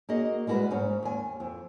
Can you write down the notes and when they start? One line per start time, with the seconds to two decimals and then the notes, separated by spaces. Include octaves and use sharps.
0.09 A#3 F#4 G#4 D#5
0.47 G3 G#3 F#4 G#4 B4
0.71 G#2 C#4
1.03 D#2 G#5
1.40 F2